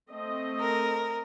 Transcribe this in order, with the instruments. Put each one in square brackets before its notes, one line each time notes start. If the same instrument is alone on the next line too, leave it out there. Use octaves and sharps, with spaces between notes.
[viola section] A3 C4 D#5
[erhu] A#4